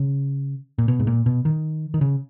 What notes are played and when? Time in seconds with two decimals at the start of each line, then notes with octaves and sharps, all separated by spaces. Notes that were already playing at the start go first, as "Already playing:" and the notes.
Already playing: C#3
0.78 A#2
0.88 B2
1.00 G#2
1.07 A#2
1.26 B2
1.45 D#3
1.94 D#3
2.01 C#3